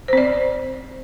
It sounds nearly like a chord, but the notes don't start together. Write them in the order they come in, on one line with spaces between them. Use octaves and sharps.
C5 C4 D5